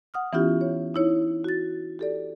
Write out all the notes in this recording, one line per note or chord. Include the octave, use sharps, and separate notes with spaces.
F#5 D#6 F6
E3 B3 C#4 E4 F4 G4
C#5
D#4 E4 C#5
F#4 A6
G4 A4 D5